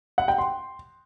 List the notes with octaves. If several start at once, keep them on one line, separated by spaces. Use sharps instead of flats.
F#5
G5
C6